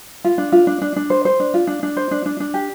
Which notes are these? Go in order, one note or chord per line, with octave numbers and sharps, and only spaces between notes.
F4
D4
F4
D4
D4
D4
C5
C5
D4
F4
D4
D4
C5
D4
D4
D4
G4